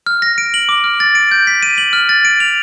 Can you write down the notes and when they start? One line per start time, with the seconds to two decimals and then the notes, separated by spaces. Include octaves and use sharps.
0.06 F6
0.22 A#6
0.38 D7
0.54 F#7
0.69 D6
0.84 F6
1.00 A6
1.15 D7
1.32 G6
1.47 B6
1.63 D#7
1.78 F#7
1.93 F6
2.09 A6
2.25 D7
2.40 F7